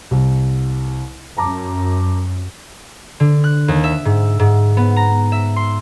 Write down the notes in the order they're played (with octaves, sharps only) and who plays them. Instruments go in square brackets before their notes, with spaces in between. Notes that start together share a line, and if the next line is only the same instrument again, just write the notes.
[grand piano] C2
[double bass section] F#2 [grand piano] A5 A#5 D6
[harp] D3
F#6
D#2
E5
G#2
G#2
B3
A#5
E5
C6